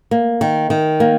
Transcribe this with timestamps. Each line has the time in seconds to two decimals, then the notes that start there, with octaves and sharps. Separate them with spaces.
0.11 A#3
0.41 D#3
0.70 D#3
1.00 A#3